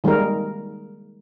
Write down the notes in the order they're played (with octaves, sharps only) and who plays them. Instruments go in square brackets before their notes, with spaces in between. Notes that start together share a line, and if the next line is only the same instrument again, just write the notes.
[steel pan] D#3 G3 G#3 A#3 A#4